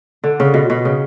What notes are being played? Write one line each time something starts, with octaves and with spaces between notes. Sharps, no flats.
D3
C#3
B2
B2
C#3